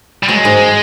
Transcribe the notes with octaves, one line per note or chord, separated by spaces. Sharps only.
G3
F#3 G#3
G#2